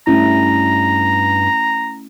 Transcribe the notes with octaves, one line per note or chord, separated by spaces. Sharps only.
G2 A3 C#4 E4 A#5